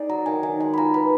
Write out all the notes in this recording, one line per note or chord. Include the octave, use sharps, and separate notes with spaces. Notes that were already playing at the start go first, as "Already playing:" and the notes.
Already playing: D#4 G#4 D5
F#3 A#5
D#3 G#5
D#3 G#5
G#3 G#5
B5
F4 A#5
B4 B5